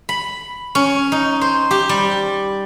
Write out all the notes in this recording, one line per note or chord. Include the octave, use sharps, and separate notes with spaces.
B5
C#4
D#4
C5
G4
G3